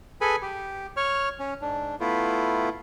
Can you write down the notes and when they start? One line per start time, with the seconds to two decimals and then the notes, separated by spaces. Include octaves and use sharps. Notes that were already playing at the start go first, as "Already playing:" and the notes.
0.21 G#4 A4 B4 G#5 B5
0.42 G4
0.97 C#5 C#6 F6
1.39 C#4
1.61 G#2 D4
2.00 A3 B3 E4 F4